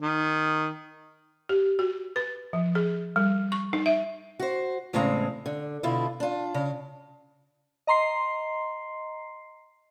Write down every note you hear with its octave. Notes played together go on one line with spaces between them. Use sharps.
D#3
G4
F#4
B4
F3
G#4
G3
C#6
D#4
E5
F#4 C5
E2 A2 C#3 G#3 C4 A#5
D3
B2 D3 E4 F4
D4 F4
C#3
D#5 A#5 C6 C7